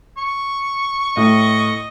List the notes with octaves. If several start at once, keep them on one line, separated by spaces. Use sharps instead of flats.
C#6
A2 D#5